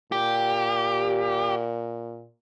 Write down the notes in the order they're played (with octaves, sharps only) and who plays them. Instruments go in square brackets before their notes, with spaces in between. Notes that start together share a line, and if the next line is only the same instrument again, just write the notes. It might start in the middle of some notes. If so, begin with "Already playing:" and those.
[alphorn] A#2 [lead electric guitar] G4